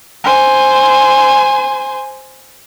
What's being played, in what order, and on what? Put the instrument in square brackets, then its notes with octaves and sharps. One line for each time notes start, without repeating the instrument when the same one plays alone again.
[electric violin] C5 G#5